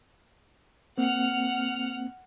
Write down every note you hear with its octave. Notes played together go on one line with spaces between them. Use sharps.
A#3 C4 F#5 F6